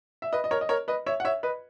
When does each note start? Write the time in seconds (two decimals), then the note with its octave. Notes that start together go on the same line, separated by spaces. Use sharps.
0.22 E5
0.33 B4 D#5
0.44 D#5
0.51 A#4 C#5
0.61 D#5
0.69 A#4 C#5
0.88 B4 D#5
1.06 C#5 E5
1.20 F#5
1.25 C#5 E5
1.43 B4 D#5